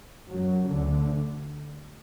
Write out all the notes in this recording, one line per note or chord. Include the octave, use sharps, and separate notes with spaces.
F#2 F#3
D2 D3